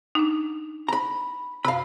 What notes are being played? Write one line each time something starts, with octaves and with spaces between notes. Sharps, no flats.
D4 D#4
A#5 B5
F#2 C3 F5 B5